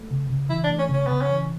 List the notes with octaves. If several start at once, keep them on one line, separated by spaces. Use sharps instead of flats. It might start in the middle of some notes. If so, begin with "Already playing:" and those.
Already playing: A3
C#3
C#3
E3 E4
D4
A3
C#4
C#3 C#4
C#3 B3
C#4
E3